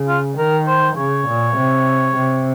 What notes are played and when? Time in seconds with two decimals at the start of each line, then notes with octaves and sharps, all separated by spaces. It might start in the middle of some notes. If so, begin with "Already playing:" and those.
Already playing: C#3
0.08 F4
0.37 D#3 A#4
0.67 C5
0.97 C#3 C#5
1.27 A#2
1.57 C3
2.16 C3